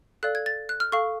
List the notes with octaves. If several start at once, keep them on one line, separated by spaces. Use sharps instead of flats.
A4 D5 F5 F#6
G#6
A6
F#6
F6
A4 F5 C#6